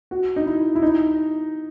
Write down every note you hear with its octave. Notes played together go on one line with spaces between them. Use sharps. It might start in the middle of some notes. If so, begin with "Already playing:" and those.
F#4
D#4
E4
E4
D#4